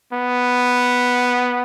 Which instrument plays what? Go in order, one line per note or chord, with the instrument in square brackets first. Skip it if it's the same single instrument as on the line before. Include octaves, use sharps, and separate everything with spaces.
[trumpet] B3